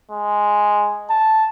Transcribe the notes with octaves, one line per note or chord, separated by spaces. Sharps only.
G#3
A5